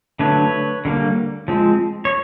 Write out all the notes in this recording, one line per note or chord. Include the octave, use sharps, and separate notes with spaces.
D3 F#3 A3 D4 B4 C#5
D3 G3 A#3
F3 G#3 C4
C#5